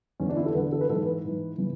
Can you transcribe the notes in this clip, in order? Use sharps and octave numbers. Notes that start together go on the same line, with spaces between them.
E2 D3 C#4
D4
E4
A4
E2 D3 B4
A4
B4
G#2 E3 A4
B4
G#2 E3
C#3 E3